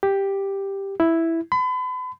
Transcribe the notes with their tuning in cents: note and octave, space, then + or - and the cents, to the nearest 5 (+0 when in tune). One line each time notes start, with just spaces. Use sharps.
G4 +5
E4 +0
B5 +40